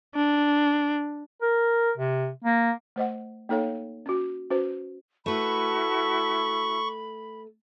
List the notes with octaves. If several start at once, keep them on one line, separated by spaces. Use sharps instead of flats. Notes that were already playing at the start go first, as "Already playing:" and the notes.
D4
A#4
C3
A#3
A3 C5 D#5 F#5
A#3 D#4 A4 C#5 F5
C#4 F#4
C#4 F#4 B4 C5
A3 E4 F#4 B4 A5 B5 C#6